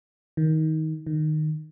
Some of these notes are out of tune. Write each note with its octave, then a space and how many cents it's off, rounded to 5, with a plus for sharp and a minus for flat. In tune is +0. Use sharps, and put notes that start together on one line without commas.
D#3 +20
D#3 -15